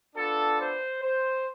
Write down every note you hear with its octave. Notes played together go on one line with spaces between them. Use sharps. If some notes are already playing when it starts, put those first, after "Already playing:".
B3 D4 F4 A4
C5
C5